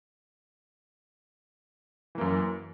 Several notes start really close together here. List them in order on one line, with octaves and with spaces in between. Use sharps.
E3 A#3 F#2